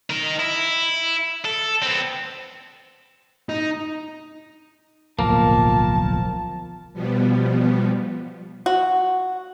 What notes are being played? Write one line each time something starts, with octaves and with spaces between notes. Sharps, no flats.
D#4 A#4
E4
A4
B3 C4
D#4
D1 B1 F3 A#3 A#4 A5
B2 F3 G3 B3
F#4